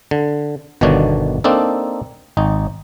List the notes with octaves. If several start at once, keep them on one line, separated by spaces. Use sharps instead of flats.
D3
G1 B2 D3 D#3 D4 C#5
A#3 C4 D4 D#4 A4
G#1 D#4